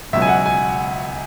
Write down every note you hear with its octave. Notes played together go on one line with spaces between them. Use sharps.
C#2 B2 F#3 E5
G#5
F#5
G#5